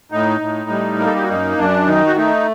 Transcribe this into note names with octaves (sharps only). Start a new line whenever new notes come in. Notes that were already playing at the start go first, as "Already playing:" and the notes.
A2 D#4
A2
G3
A#3 A#4
A4
G4
F#4
F#2 D#4
F#2 D4
D#3 D#4
F#4
A3 D#4